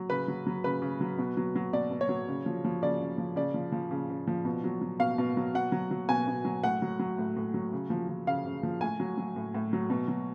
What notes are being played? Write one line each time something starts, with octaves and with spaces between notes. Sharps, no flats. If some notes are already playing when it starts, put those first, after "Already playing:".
Already playing: F#3
C#3 B4
F#3
F#3
C#3 B4
C#3
F#3
B2
F#3
F#3
B2 D5
B2
C#5
F#3
C#3
F3
F3
C#3 D5
C#3
F3
C#3 D5
F3
F3
C#3
C#3
F3
B2
F#3
F#3
B2 F5
B2
F#3
B2 F#5
F#3
F#3
B2 G#5
B2
F#3
A2 F#5
F#3
F#3
A2
A2
F#3
C#3
F3
F3
C#3 F5
C#3
F3
A2 G#5
F#3
F#3
A2
A2
F#3
B2
F#3